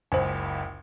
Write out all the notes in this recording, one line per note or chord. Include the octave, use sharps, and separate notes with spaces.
F#1 C#2 C5 G#5